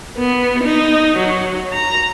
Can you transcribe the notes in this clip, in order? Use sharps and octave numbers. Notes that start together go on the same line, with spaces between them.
B3
D#4
F#3
A#5